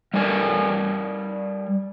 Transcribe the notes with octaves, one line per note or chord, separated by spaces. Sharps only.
G3 A#4 B4 D5 G#5